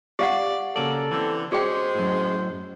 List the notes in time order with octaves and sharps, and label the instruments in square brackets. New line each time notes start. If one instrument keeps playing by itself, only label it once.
[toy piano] G4 F5 F#5 [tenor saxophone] D5
[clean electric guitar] C#3 A#3 D5 [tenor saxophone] F#3 [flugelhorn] A4
[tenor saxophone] D3 [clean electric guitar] E3 C4
[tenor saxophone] G#3 [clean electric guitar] C#4 [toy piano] F#4 G#4 G5 [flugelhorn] C5
[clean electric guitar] F#2 A2